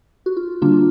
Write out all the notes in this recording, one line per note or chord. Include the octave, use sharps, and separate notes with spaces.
F#4
F4
D3 G3 A#3 D4 F4